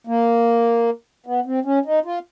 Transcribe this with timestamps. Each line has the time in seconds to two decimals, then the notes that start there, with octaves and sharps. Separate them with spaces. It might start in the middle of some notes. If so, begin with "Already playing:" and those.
0.07 A#3
1.26 B3
1.46 C4
1.65 C#4
1.86 D#4
2.05 F4